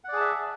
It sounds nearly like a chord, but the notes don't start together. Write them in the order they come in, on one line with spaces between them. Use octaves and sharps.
F#5 D5 G#4 A5 E5